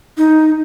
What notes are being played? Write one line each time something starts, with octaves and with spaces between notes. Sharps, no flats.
D#4